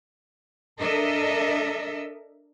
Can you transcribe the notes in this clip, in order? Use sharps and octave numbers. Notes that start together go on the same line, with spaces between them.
D4 A4 A#4 D#5 E5